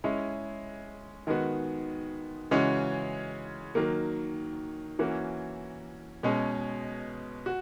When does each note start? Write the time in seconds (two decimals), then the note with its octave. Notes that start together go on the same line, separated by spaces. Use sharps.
0.04 G#3 C#4 E4
1.27 D#3 G#3 B3 F#4
2.51 C#3 E3 G#3 C#4 F#4
3.75 D#3 F#3 A#3
4.99 E3 A#3 C#4 F#4
6.23 B2 G#3 C#4
7.46 F#4